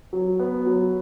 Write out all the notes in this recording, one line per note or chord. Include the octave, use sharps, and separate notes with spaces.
F#3
B3
F#3